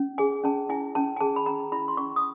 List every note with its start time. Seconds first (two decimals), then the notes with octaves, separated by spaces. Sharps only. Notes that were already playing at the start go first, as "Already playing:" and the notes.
Already playing: C#4
0.18 G#4 G#5
0.44 C#4 A5
0.69 E4 G#5
0.95 C#4 A5
1.17 G#5
1.21 G#4 A5
1.36 B5
1.46 C#4 A#5
1.72 E4 B5
1.88 C6
1.97 C#4 C#6
2.16 D#6